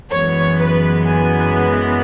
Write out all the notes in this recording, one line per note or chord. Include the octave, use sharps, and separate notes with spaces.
F#2 E3 G#3 B3 C#5
B4
G#5